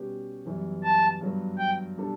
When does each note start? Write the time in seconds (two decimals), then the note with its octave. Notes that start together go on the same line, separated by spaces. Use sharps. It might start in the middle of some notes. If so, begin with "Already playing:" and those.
Already playing: B2 G3 C#4 G4 B4
0.46 F#2 E3 G3 B3 E4
0.83 A5
1.21 G2 F#3 B3
1.59 G5
1.97 B2 G3 D4 A4